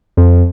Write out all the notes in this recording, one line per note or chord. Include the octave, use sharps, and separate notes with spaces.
F2